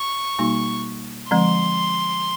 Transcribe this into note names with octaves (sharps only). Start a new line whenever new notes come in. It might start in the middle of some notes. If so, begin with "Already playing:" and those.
Already playing: C#6
B2 G3 A#3 D#4 F#4
D3 F3 G#3 C4 C6